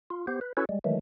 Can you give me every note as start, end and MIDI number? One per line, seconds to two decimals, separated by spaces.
0.10 0.26 65
0.27 0.40 59
0.27 0.40 67
0.27 0.40 72
0.41 0.53 71
0.57 0.65 61
0.57 0.65 64
0.57 0.65 66
0.57 0.65 69
0.57 0.65 71
0.57 0.65 73
0.69 0.79 55
0.69 0.79 56
0.84 0.99 51
0.84 0.99 52
0.84 0.99 54
0.84 0.99 56
0.84 0.99 57